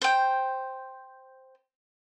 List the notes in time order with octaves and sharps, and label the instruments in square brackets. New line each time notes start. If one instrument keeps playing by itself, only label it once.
[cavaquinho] C5 G5